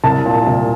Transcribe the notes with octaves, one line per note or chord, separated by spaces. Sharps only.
C2 A5
A#2
C2